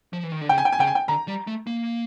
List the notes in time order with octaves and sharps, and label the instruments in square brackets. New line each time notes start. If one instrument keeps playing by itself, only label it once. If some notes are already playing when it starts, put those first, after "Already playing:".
[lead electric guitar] F3
E3
D#3
D3
[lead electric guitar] C#3 [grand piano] G5
[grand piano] G#5
G5
G#5
[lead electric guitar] C#3 [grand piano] G5
[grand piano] G#5
G5
[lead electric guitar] D3 [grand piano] A#5
[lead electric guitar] G3
A3
A#3